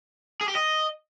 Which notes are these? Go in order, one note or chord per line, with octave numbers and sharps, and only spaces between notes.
G#4
G4
D#5